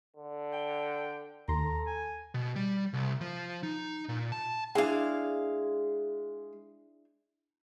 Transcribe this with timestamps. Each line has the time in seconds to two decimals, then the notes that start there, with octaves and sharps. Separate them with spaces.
0.16 D3
0.53 G5
1.48 D#2 A4 A#5 C6
1.87 G#5
2.35 B2
2.56 G3
2.93 C2
3.21 F3
3.63 D#4
4.09 A#2
4.32 A5
4.75 G#3 D4 E4 F5 G#5